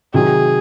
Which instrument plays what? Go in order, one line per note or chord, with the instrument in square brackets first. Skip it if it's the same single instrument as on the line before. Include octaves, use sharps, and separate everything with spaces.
[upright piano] C3 D#3 F#3 [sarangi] G#4